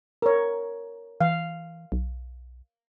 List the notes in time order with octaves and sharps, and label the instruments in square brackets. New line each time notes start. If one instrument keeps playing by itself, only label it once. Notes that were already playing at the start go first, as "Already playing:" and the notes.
[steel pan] A#4 C#5
[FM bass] E3 [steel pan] F5
[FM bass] B1